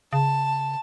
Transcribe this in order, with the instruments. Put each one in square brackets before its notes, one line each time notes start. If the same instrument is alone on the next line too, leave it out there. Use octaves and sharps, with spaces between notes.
[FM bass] C#3 [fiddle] A5